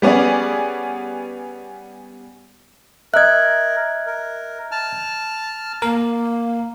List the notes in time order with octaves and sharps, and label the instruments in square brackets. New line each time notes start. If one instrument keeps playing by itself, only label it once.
[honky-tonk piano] G3 B3 C#4 G#4 D5
[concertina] A#4 [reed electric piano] D#5 E5 [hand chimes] F#6 G#6
[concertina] A#4
A5 F6
[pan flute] A#3 [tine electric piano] A#4